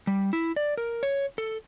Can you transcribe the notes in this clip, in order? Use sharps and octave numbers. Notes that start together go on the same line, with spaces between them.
G3
E4
D5
A#4
C#5
A4